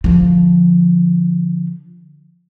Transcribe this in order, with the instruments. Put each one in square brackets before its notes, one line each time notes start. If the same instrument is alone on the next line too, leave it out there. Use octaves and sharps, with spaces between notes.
[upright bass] D3 F3